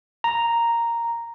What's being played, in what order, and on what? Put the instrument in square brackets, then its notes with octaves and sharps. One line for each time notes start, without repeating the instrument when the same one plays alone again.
[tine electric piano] A#5